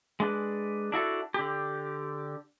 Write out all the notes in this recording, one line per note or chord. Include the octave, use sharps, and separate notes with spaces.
G#3 D4 B4
D4 E4 F#4 A4
D3 G4